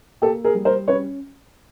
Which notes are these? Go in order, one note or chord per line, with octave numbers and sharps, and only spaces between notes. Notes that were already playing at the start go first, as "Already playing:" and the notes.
A#3 G4 A4
G#4 A#4
G3
A#4 C5
C#4 B4 C#5